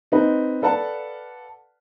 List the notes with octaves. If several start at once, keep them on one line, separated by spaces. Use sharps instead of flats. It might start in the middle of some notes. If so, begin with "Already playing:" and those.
C4 D#4 B4
A4 B4 D5 F5 F#5 A5